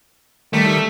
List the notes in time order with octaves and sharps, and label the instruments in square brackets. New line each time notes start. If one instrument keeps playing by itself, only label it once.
[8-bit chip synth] D#3 G3 B6 [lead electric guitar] A3